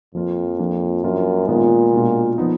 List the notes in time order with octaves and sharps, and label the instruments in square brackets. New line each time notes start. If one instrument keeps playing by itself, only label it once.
[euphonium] F2 [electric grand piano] F3 A#3 F4
[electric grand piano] F3 A#3 D4
[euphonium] F#2 [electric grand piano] F3 A#3 D4 F4
[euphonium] A#2 [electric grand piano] D#3 G#3 B3 F4
[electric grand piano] B2 G#3 D4 F4
F3 B3 D#4